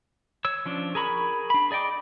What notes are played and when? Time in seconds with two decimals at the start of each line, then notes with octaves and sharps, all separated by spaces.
0.45 C#5 E6
0.66 F3 C#4 D4
0.95 G#4 A#4 A#5 B5 C#6
1.50 D4 B5
1.71 G#4 D5 D#5 G5 D6